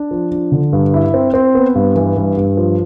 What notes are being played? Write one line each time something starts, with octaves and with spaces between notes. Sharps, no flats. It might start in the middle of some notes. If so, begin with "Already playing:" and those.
Already playing: D4
F3
D4
D3
G2
E4
C4
C4
B3
G2
E3
G2
G2
F3